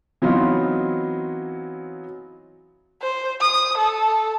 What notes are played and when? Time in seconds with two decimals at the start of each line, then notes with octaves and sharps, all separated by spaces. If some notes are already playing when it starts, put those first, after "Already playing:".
0.22 E3 F#3 B3 C4 D#4 F4
3.02 C5
3.41 D#6
3.78 A4